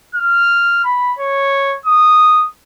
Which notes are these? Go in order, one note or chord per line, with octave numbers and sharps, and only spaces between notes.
F6
B5
C#5
D#6